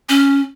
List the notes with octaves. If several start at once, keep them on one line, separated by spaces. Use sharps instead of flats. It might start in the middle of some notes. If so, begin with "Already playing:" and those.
C#4